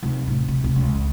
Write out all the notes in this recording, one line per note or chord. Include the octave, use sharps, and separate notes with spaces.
D#2 C3
A2 E4
C3
C2
C#2